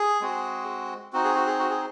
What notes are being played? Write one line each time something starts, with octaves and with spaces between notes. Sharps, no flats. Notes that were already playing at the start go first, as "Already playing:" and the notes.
Already playing: G#4
G#3 C4 F#4
C4 D#4 F#4
G#4
F#4
G#4
F#4
G#4